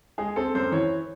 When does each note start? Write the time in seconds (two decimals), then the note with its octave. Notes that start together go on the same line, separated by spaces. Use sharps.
0.18 G#3 G#4
0.36 C4 A4
0.54 F#2 C5
0.72 E3 C#5